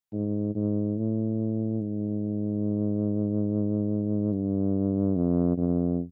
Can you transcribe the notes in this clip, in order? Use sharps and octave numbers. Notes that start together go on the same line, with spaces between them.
G#2
G#2
A2
G#2
G2
F2
F2